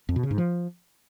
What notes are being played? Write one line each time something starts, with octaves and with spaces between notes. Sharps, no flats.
F2
B2
C#3
G#2
F3